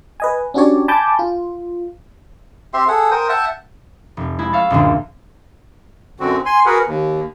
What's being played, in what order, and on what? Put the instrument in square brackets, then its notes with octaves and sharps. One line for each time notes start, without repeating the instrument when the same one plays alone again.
[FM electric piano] B4 D#5 G#5
C#4 D4 F#4 G4 C#5 D5
G#5 A5 B5 D6 G6
F4
[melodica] C4 G4 E5 C6
G#4 A4 F#5
A#4 C5 G5 D#6
E5 F#5 G5 A5
[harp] F1
G#3 E4 G#6
E5 F5 C#6 A6
F#1 D2 A#2 D3
[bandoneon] F#2 D3 C4 F#4
G#5 C6
F#4 G#4 A#4 B4 F#5
D#2